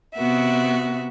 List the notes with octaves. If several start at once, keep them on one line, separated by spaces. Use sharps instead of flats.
C3 B3 F#4 E5